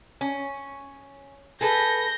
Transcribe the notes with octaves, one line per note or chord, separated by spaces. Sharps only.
C#4
G#4 A4 B4 G6 A#6